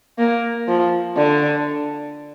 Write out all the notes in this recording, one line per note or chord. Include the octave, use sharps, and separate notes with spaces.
A#3
F3
D3